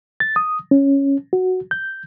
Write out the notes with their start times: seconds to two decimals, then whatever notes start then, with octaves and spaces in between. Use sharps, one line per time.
0.20 A6
0.36 D#6
0.71 C#4
1.33 F#4
1.71 G6